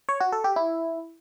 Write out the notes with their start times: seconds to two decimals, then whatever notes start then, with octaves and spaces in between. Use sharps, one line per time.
0.09 C#5
0.20 F#4
0.32 A4
0.44 G4
0.56 E4